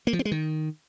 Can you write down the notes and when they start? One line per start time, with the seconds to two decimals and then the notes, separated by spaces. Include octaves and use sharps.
0.07 A#3
0.13 F3
0.19 C4
0.25 G#3
0.32 D#3